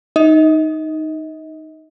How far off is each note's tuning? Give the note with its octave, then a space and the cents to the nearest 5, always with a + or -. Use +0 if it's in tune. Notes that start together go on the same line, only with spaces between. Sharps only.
D#4 +0 D#5 +40